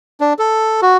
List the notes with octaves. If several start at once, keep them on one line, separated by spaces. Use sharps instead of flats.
D4
A4
F#4